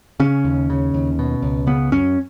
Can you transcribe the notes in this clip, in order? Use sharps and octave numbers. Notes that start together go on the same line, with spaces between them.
C#3 C#4
D#2
C#3
D#2
B2
C#2
C#3 B3
F#2 C#4